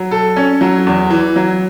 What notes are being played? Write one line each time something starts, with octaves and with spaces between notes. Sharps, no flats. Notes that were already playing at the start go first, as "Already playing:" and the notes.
Already playing: F#3
A4
C#4
F#3
E2
E3
F#3